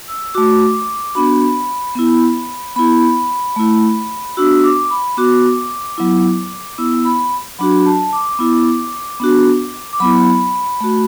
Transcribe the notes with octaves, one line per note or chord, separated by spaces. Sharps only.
E6
A3 F#4 D6
B3 D4 F#4 B5
B3 E4
B3 E4 B5
A3 E4
B3 D4 F#4 E6
D6
B5
B3 F#4 D6
F#3 B3 E4
B3 E4 E6
B5
F#3 D4 F#4 B5
A5
D6
B3 E4
B3 D4 F#4
D6
F#3 B3 E4 B5
A3 F#4